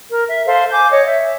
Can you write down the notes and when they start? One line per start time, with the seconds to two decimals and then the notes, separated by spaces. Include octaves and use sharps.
0.10 A#4
0.28 E5
0.46 A4 C5 F5
0.71 G#5 D6 G6
0.91 C#5 D#5
1.05 E5